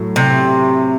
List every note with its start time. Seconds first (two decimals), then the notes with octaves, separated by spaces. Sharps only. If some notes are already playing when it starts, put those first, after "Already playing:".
Already playing: A2 F#3 A3
0.16 C3